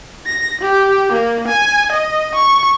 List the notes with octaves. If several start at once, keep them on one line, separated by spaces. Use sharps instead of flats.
A#6
G4
A#3
G#5
D#5
C#6